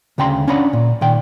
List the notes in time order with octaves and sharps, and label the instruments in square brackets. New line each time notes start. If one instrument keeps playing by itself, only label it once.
[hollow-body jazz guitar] D2 C#3 G5 A#5 C6
C#4 D4 C#5 F#5 A#5 B5
A#2
A#2 D#3 G5